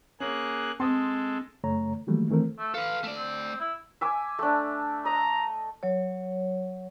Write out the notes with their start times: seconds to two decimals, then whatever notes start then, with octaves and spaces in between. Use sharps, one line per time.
0.20 A#3 C#4 G#4 F#6
0.80 G#3 C4 A4 C6 D#6
1.64 F#2 C#3 A3 C#5 A#5
2.07 D#3 E3 F#3 G3 A3 A#3
2.29 D#3 E3 A3 C4 A#4
2.59 A3
2.74 A4 B4 F5
3.04 A3 D5
3.16 C4
3.60 E4
4.01 E5 G#5 D6
4.39 A3 D4
5.05 D#5 A#5
5.83 F#3 C#5